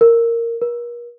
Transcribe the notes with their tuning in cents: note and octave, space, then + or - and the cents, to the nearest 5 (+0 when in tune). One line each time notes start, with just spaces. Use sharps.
A#4 -10
A#4 +40